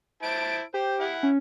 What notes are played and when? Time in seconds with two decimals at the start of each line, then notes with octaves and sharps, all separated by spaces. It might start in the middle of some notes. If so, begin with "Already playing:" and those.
0.23 E4 C5 A5 D7
0.74 G4 C5
1.00 E4 F#5
1.23 C#4